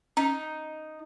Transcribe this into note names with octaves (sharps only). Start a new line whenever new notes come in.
C#4 D#4